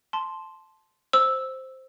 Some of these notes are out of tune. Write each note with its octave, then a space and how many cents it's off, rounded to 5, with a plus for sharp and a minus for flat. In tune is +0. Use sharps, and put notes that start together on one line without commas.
A5 -10 C6 +0
C5 +5 E6 -5